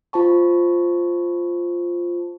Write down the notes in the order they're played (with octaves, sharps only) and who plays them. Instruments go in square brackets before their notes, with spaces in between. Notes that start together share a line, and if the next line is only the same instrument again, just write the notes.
[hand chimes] F4 C5 A5 C#6